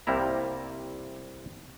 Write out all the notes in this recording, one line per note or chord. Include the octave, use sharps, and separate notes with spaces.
C2 C3 G3 A#3 E4 A#5